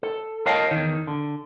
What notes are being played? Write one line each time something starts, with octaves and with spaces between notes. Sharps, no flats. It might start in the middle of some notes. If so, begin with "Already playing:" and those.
A4
A#4 C#5 D#5 F5 G5 A5
E2 D#3
D3